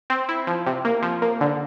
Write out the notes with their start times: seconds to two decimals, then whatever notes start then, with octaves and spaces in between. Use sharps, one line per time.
0.10 C4
0.29 E4
0.47 F3
0.66 C3
0.85 A#3
1.02 F3
1.22 A#3
1.41 D3